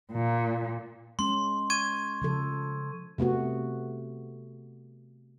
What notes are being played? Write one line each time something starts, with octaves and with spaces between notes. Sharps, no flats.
A#2
G#3 C#4 C6
C#6 G#6 D#7
C#3 F3 A4
C3 A3 B3 F#4